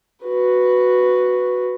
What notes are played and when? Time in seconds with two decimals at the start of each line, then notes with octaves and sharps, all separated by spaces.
0.24 F#4 B4